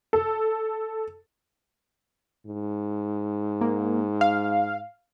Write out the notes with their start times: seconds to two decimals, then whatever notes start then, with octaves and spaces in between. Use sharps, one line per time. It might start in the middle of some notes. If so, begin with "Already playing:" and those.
0.13 A4
2.46 G#2
3.61 A#3
4.21 F5